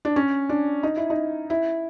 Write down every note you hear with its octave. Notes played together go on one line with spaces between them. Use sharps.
D4
C#4
D4
D#4
E4
D#4
E4